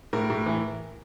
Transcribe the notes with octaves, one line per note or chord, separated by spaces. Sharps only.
A2 A#4
A2
E3